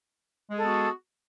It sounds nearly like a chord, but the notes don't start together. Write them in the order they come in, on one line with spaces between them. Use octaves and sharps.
G#3 G#4 A4 B3 F#4